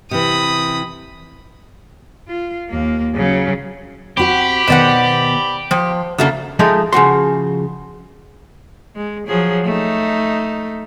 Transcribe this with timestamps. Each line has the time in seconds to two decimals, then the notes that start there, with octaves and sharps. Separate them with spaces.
0.11 C3 E3 B5 D#6
2.28 F4
2.70 D#2 A#3
3.15 C#3 F#3
4.17 C4 F#4 G4 F#5 B5
4.68 B2 D#3 B3 C5 D5 F#5
5.71 F3 C5 G5
6.18 C#3 A3 A#3 D4 F#4
6.59 F3 G#3 A3 D#4
6.92 C#3 F3 F#4 C6
8.96 G#3
9.28 F3 F#3 G#4
9.65 A3 D#4